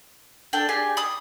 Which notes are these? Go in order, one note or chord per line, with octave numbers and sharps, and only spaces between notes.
D4 A4 G5
D4 G4 G#4
B5 D#6